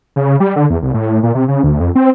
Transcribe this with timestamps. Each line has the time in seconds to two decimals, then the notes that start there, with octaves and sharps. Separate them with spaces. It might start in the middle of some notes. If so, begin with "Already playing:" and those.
0.16 C#3
0.40 G3
0.56 D3
0.70 E2
0.82 C2
0.94 A2
1.23 A#2
1.35 C3
1.48 C#3
1.63 D2
1.80 F2
1.95 C4